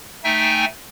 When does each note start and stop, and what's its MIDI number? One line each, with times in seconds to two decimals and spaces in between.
0.24 0.65 57
0.24 0.65 63
0.24 0.65 76
0.24 0.65 79
0.24 0.65 80